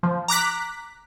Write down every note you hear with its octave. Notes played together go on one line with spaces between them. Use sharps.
F3
A#5 D6 F#6 B6